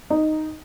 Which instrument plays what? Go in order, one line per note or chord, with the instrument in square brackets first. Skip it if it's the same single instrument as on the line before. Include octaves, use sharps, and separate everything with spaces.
[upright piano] D#4